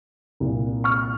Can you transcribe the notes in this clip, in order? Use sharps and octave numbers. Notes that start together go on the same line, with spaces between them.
C2 A#2
C#6 F6